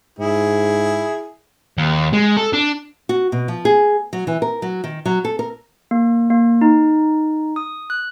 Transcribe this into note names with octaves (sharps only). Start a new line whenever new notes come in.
G#2 E4 G#4
D#2
G#3
A4
D4
F#4
B2
F3
G#4
F#3
E3
A#4
F#3
D#3
F#3
A4
A#4
A#3
A#3
D#4
D#6
F#6